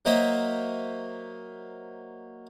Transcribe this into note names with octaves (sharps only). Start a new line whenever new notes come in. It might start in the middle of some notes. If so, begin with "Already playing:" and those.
F#3 A#3 C5 D#5 E5